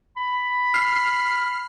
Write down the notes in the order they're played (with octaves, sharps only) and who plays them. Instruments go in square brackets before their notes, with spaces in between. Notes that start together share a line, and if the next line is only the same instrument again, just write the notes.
[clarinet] B5
[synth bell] F6 C7